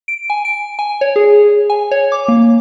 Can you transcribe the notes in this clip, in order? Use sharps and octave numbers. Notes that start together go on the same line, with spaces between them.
D7
G#5
D7
G#5
C#5
G#4
G#5
C#5
D6
A#3